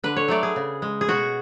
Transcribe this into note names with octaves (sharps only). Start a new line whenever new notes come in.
D3 B4
C#5
F#3 A3 D5
G#4
C#3
G#3
G#4
B2 F#4